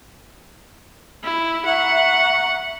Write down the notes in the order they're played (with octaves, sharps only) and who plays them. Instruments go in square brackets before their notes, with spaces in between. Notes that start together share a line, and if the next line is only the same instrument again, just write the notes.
[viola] E4
[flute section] E5 A#5 C#6 [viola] F#5